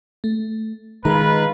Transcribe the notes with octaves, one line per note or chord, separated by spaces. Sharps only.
A3
D#3 G#3 F4 B4 A#5